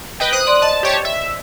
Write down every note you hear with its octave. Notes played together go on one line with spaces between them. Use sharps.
B4 D#5 G5
C5 D#6 F#6
D5 C6
D#5 A5
G4 C#5 A5
E5